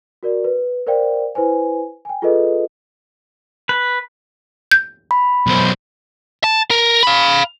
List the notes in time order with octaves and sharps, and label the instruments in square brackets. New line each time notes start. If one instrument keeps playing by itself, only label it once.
[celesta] F#4 A#4 D5
B4
A#4 C5 D5 F5 G5
E4 B4 C5 G#5
G5 G#5
F4 G#4 A4 B4 D#5
[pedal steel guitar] B4
[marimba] G6
[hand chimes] B5
[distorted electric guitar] B1 C5
[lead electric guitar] A5
A#4
F5 B5